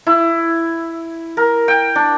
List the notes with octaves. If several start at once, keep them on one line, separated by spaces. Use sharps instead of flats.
E4
A#4
G5
D4